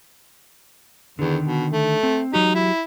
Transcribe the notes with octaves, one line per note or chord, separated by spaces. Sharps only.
E2 D3 D#3
B2
A3
C4
F#3 D#4 F#4 G4
E4